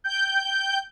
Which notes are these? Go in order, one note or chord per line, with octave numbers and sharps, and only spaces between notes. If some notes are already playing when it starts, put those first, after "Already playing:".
G5 G6